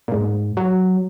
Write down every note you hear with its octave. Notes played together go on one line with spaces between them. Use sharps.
A#2
G#2
F#3